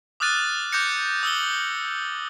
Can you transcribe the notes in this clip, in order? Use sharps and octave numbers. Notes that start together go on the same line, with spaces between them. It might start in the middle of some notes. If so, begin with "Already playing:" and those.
D6 D#6 F6 F#6 A6 D#7
D6 F#6 G6 A#6 C#7
D#6 E6 F#7 G7